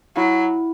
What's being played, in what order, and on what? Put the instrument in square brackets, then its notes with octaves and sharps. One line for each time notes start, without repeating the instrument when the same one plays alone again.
[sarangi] F#3 [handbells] E4